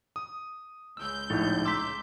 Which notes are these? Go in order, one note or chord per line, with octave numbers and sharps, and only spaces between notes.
D#6
C#2 E6 G6
A#1 A2 D#4
A#5 C6 D6 E6 B6